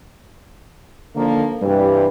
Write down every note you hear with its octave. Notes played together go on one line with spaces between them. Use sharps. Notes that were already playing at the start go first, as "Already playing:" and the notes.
D3 D#3 F3 A#3
G2 C3 E3 G3